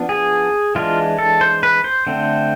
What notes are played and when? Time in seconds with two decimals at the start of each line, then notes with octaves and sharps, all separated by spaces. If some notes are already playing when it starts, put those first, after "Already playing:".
Already playing: F3 B3 D4
0.09 G#4
0.75 E3 G#3 D4 F4
1.19 A4
1.41 C5
1.63 B4
1.84 C5
2.07 D3 A3 C4